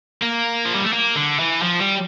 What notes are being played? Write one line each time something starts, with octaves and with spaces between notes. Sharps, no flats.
A#3
F3
G3
A3
A#3
D3
E3
F3
G3